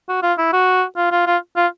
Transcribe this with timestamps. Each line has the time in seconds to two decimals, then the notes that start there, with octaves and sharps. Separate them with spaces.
0.09 F#4
0.23 F4
0.38 E4
0.53 F#4
0.97 F4
1.12 F4
1.27 F4
1.56 F4